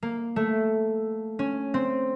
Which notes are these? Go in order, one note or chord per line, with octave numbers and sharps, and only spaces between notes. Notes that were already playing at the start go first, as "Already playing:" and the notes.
A#3
A3
C#4
C4